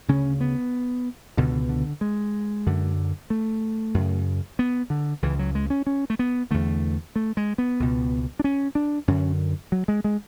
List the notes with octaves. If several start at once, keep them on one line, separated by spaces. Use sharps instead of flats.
D2 C#3 C#4
B3
C#2 B2 D3
D3
G#3
F#2 D3
A3
F#2 C#3
B3
D3
C#2 C#3 E3
F#3
G#3
C#4
C#4
A3
B3
E2 D3 A3
A3
G#3
B3
C#2 B2
D4
C#4
D4
F#2 D3 C#4
F#3
G#3
G#3